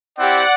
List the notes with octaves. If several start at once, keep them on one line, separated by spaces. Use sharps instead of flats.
C4 E4 G4 D5 F#5